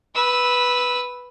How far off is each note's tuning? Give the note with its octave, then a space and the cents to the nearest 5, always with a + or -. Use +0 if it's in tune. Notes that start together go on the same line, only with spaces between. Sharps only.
B4 +0 E6 -10